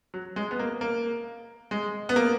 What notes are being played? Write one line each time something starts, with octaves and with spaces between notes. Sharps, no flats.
F#3
G#3
B3
A#3
A#3
G#3
B3
A#3